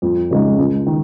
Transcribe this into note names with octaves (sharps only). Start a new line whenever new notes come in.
F2
C#3 G#3 D#4
C#2
D#3